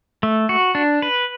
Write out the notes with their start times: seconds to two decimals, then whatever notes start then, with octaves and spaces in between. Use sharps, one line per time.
0.23 A3
0.49 F#4
0.75 D4
1.02 B4